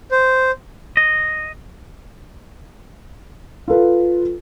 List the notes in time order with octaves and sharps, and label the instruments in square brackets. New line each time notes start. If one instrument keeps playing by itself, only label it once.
[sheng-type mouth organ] C5
[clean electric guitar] D#5
[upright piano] F4 A4 B4